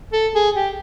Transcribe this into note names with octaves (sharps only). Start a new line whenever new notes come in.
A4
G#4
G4